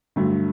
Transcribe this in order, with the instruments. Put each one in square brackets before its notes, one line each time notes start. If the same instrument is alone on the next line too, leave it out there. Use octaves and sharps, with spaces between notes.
[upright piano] G2 D3 F#3 A3